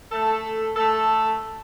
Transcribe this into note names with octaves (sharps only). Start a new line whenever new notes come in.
A3 A4
A3 A4